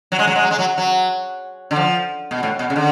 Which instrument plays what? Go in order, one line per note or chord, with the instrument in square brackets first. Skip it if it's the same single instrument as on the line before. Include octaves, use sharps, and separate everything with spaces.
[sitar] F#3
G#3
F#3
G#3
F#3
G#3
F#3
F#3
D3
F3
B2
A2
B2
C#3
D3